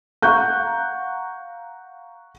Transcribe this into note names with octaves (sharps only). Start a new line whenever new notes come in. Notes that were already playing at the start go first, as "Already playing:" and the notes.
F5 F#5 A#5 C#6 F#6 G6